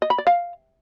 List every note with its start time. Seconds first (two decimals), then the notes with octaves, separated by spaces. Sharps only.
0.02 D#5
0.10 B5
0.18 D5
0.27 F5